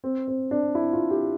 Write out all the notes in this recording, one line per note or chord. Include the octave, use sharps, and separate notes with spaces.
C4
C4
D4
E4
F4
G4